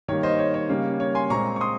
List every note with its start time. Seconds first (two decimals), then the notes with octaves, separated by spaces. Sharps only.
0.08 D#3 G3 A#3 C#5
0.23 C5 D#5
0.39 C#5
0.54 C#5
0.69 C#3 G3 A#3
1.00 C#5
1.15 G#5 C6
1.30 A#2 G#3 C4 A#5 C#6
1.56 C#6
1.61 C6 D#6